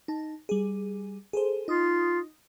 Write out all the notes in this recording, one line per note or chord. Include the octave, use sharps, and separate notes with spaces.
D#4 A5
G3 G#4
G#4 A4 C5
D#4 F4 D#6